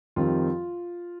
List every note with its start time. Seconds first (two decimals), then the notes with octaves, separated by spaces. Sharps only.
0.16 F2 D#3 G3 C4 F4